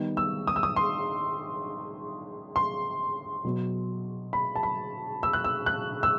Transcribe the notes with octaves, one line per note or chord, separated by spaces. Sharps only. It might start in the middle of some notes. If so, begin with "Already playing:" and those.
Already playing: D#3 G3 B3 D#4
E6
D#6
E6
D#6
C6
C6
B2 F#3 B3
B5
A5
B5
E6
F#6
E6
F#6
E6